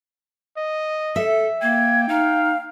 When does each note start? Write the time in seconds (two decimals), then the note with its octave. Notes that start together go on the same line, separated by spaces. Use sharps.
0.57 D#5
1.16 A4 E5
1.62 A#3 G5 G#6
2.09 D#4 F5